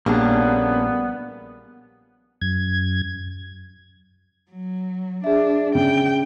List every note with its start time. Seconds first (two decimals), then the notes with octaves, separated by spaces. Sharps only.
0.06 A#1 G3 A#3 B3 C#4 D4 G#4
2.42 F#2 G#6
4.51 F#3
5.24 D4 G#4 E5
5.75 C#3 G5